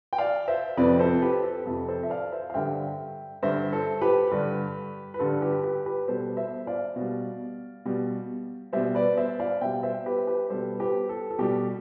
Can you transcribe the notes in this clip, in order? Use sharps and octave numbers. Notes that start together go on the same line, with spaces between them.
G5
D5 F5
C5 E5
F2 C3 F3 B4 D5
A4 C5
G4 B4
A4
F2 C3 F3 A4
A4 C5
E5
D5 F5
C5 E5
F5
G2 D3 G3 E5 G5
G2 D3 G3 C5 E5
A4 C5
G4 B4
G2 D3 G3
B4
G2 D3 G3 A4
G4 B4
G4 B4
G4 B4
B2 G3 A4 C5
C5 E5
D5 F5
B2
G3
B2 G3
B2 G3 C5 E5
B4 D5
C5 E5
D5 F5
B2 G3 E5 G5
C5 E5
G4 B4
G4 B4
B2 G3 A4 C5
G4 B4
A4
A4
B2 G3 G4